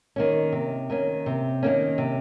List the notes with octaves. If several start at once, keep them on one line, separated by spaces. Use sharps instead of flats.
D#3 A#3 C#4
C3
D#3 A#3 C#4
C3
D#3 A#3 C#4
C3